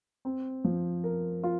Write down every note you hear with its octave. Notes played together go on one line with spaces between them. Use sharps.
C4
F3
A#4
F4